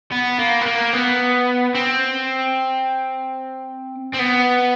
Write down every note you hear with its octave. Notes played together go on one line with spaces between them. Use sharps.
B3
A#3
B3
A#3
B3
C4
C4
B3